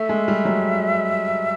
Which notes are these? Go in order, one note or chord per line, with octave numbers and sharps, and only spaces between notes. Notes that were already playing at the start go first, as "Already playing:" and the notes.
Already playing: A3 E5
G#3
G3
F#3